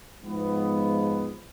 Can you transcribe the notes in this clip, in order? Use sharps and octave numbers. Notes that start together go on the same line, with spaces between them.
G#2 F3 G#3 B3